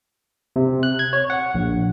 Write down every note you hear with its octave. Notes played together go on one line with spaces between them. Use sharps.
C3
F#6
G#6
C#5
F#5
A#1